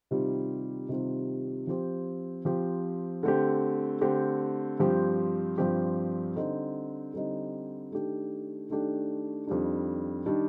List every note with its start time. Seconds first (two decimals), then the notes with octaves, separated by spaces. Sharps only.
0.11 C3 D#3 G3 C4 F4
0.89 C3 D#3 G3 C4 F4
1.67 F3 C4 G4
2.45 F3 C4 G4
3.23 D3 A3 C4 G4
4.01 D3 A3 C4 G4
4.80 G2 F3 C4 G4
5.58 G2 F3 C4 G4
6.36 D3 G3 C4 D#4
7.14 D3 G3 C4 D#4
7.91 D#3 A3 D4 G4
8.70 D#3 A3 D4 G4
9.47 F2 D#3 G3 D4
10.26 D#3 G3 D4